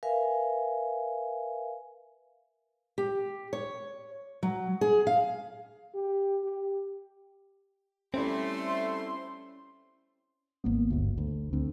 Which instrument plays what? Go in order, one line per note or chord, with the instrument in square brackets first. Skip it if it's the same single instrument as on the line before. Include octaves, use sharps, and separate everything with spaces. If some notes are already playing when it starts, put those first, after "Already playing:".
[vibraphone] A#4 B4 E5 F5 G#5
[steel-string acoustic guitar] G4
C#5
F#3
G#4
F5
[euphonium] G4
G4
[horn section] G3 A3 [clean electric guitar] C4 E4 [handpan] C#4 D5 [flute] C6
[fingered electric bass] G#1 A#3 B3
G1 D2
D2
D2 C4 D4